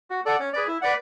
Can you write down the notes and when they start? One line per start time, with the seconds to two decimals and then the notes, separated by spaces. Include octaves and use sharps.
0.10 F#4
0.26 A4 D5 F#5
0.40 C#4
0.53 G#4 B4 D5
0.67 E4
0.81 B4 D5 F#5